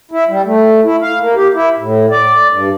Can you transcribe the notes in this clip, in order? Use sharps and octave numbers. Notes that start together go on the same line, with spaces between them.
E4
G3
A3
E4
F5
A#3
G4
E4
A2
D5
G2